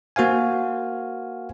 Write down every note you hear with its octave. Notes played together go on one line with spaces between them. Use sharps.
A#3 F#4 C5 F5 G#5